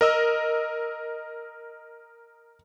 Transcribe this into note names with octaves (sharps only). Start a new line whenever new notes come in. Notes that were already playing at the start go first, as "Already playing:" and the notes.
A#4 D#5 E6